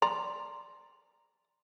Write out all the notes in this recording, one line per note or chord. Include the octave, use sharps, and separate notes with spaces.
D5 A#5 C6